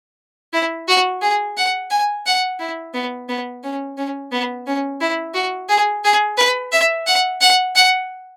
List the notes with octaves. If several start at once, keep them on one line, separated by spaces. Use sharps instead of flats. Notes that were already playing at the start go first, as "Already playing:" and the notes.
E4
F#4
G#4
F#5
G#5
F#5
E4
B3
B3
C#4
C#4
B3
C#4
E4
F#4
G#4
G#4
B4
E5
F#5
F#5
F#5